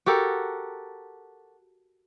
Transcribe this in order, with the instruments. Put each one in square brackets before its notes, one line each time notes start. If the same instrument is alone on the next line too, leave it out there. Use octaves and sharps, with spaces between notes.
[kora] F#4 G4 A4 A#4